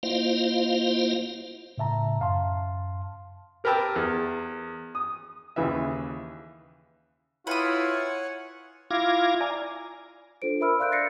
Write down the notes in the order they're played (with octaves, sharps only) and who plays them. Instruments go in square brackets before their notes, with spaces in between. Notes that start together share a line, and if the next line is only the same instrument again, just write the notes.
[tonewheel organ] A#3 E4 F4 C5 D#5 F5
[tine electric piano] A2 C#3 E5 A5 A#5
F#2 F5 A5 C6
[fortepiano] G4 A#4 B4 G5 A5 E6
E2
D#6
D#2 C#3 E3 B4 E5
[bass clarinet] E4 [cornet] F4 [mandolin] B4 D#6 [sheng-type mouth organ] C#5 F#5 G#5
[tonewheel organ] E4 F4 F5 D6 G#6 A#6
D5 G#5 A#5
[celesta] D4 F4 A4 C5 D7
A#4 E5 B5 E6 F6
D5 F5 C6 F#6 G6 D7
A6 A#6 C7 C#7